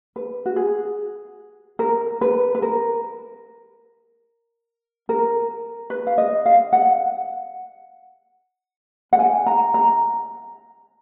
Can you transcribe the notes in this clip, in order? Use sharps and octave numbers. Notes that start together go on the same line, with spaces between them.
B4
F#4
G#4
A#4
B4
B4
A#4
A#4
B4
F5
D#5
F5
F#5
F#5
G#5
A#5
A#5